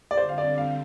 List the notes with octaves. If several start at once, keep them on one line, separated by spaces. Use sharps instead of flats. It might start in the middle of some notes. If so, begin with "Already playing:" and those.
D5
D3 G3 C4 C5
F5
D5
F5